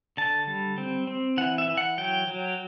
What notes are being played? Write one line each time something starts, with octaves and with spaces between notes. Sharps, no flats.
D3 A5
G3
C4
C4
E3 F#5
E5
E3
F#5
F#3 G5
F#3